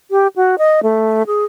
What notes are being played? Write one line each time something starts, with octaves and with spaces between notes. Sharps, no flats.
G4
F#4
D#5
A3
G#4